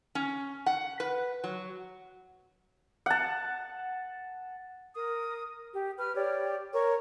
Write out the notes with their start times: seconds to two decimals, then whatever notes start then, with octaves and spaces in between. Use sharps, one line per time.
0.15 C#4
0.66 F#5
1.00 B4
1.44 F#3
3.06 F#5 A5
4.95 A#4 D#6
5.72 G4
5.96 B4 F6
6.15 G4 C#5 D5
6.73 A#4 C#5 C#6